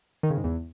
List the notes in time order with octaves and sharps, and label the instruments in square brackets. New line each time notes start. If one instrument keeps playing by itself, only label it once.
[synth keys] D#3
C#3
G#2
E2